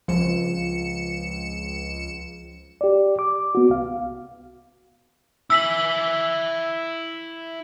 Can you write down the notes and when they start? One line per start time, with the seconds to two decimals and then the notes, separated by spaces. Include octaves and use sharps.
0.08 C#2 F3 C#7 E7
2.81 G4 D5
3.19 D6
3.55 B3 F#4
3.70 C2 F5
5.50 E4 G#5 E6 B6 F#7